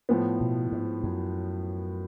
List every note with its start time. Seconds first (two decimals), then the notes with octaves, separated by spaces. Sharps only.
0.09 A2 F3 B3
0.41 B2
0.72 G#2
1.03 F#2